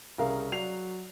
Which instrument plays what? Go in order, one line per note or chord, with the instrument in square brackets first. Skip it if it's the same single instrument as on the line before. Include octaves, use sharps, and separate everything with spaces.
[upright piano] C2 A#4 F5 [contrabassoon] C#3
[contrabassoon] F#3 [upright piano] D5 C7 F7